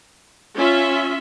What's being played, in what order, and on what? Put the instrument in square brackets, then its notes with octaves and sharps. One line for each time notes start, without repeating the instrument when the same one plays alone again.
[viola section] C#4 F4 E5